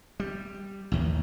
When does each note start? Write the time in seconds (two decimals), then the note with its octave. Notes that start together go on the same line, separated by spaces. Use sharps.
0.20 G3
0.92 A1 D#2